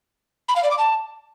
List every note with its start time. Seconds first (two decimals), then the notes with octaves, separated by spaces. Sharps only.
0.49 B5
0.56 F5
0.63 D5
0.71 D6
0.78 A5